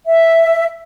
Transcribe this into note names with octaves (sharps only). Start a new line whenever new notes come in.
E5